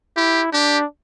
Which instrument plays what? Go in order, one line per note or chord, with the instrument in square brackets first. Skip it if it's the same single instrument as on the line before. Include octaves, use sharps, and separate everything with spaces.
[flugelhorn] E4 [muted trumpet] G4
[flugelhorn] D4 [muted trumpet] G4